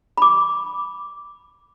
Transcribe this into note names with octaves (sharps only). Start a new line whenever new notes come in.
B5 D6